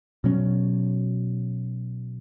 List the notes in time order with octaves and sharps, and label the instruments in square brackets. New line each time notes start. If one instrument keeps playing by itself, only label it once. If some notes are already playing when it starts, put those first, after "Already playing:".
[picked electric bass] B2 F#3 C#4